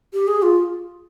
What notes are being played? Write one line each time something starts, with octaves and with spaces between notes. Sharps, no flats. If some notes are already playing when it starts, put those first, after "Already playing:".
G4
G#4
F4